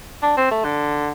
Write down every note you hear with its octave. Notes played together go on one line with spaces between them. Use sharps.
D4
C4
A3
D3